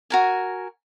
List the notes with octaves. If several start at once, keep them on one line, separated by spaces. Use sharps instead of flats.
F#4 A#4 G#5